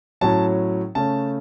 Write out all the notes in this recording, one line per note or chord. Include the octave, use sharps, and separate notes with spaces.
A2 F#3 C#4 A5
C#3 A3 C#4 A5